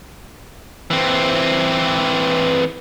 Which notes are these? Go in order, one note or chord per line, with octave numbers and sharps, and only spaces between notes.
E3 C4